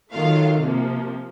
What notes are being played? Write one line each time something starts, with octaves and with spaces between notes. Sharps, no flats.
D#3 F#3 A3 F4 F5
C3 F3 A#3